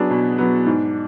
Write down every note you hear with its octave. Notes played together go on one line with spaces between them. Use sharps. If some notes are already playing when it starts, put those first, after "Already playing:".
Already playing: F#3 B3 D4 G#4
B2
F#3 B3
G#2